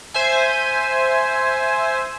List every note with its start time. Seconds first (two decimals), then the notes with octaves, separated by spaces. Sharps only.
0.14 C5 E5 G#5